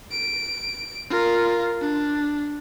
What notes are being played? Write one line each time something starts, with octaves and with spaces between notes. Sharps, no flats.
D7
F4 A#4
D4